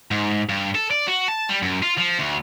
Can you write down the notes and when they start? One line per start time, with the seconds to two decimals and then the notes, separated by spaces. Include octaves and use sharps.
0.11 G#2
0.49 G2
0.75 A4
0.91 D5
1.08 F#4
1.28 A5
1.50 G3
1.62 F#2
1.82 F4
1.97 F3
2.19 D2